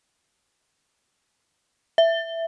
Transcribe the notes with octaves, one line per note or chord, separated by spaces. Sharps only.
E5